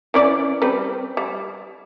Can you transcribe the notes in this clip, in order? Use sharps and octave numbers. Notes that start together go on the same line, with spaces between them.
E3 C#4 D5
G3 C4 B4
G3